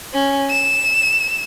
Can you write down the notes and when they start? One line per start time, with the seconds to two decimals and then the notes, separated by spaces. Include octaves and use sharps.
0.14 C#4
0.50 E7